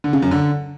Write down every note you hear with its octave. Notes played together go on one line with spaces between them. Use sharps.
D3
C#3
F#2
D3